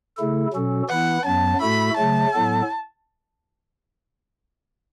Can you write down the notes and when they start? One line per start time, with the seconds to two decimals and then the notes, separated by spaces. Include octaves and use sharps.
0.17 C#3 A3 E4 A4
0.54 B2 F#3 C#4 F#4 A4
0.89 E3 B3 E4 F#5
1.25 F#2 F#3 B3 A5
1.61 A2 A3 F#4 A4 B5
1.97 C#3 F#3 A3 A5
2.33 A2 F#3 B3 A4